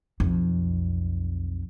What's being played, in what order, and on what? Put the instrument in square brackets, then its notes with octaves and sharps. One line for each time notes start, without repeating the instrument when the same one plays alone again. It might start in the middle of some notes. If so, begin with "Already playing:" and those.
[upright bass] B1 F2